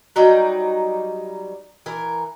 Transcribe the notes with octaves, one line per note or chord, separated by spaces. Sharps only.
F#3 G3 D#4 D5
E3 A#4